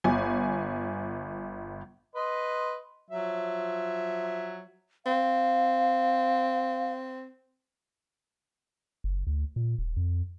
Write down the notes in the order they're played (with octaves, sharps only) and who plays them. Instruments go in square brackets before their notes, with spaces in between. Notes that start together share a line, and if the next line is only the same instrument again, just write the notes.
[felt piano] G1 G#5
[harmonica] B4 D#5 C6
F3 F#3 E5
[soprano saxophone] C4 [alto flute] F5
[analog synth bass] F#1
D2
A#2
D#1
F2